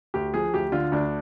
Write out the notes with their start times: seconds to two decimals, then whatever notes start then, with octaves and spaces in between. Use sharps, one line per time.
0.14 D2 G4
0.34 F3 G#4
0.54 D2 G4
0.72 D3 F4
0.92 D2 D4